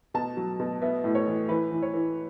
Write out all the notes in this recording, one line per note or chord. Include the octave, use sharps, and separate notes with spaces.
B2 A5
F#3
B2
B3 E5
A2
C#5
E3
E3 B4
E3
C#5
E3